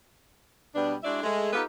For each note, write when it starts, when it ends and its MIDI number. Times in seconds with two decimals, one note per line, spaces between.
0.75 0.96 47
0.75 0.96 55
0.75 0.96 59
0.75 0.96 62
1.04 1.20 56
1.04 1.20 62
1.04 1.20 64
1.04 1.20 66
1.04 1.20 74
1.04 1.20 76
1.23 1.52 56
1.23 1.52 57
1.53 1.63 59
1.53 1.63 63
1.53 1.63 65
1.53 1.63 67
1.53 1.63 69
1.53 1.63 71